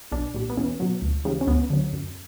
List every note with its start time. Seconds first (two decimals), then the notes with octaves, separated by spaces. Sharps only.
0.12 B1 D4
0.34 A#2 G3
0.50 B3
0.57 E2 C#4
0.80 B2 F#3
1.02 D2
1.25 C#3 E3 G3
1.41 C#4
1.47 D2 B3
1.70 D3 F#3
1.93 F#2